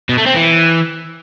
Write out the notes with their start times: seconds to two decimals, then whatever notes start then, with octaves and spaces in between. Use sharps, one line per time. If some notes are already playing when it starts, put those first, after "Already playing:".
0.09 B2
0.18 A3
0.26 C4
0.35 E3